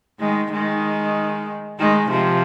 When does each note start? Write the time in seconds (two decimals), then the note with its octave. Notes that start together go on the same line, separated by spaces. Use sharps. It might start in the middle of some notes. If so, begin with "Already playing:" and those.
0.20 D#3 G#3
0.52 D#3 G#3
1.79 D#3 G#3
2.10 C3 F3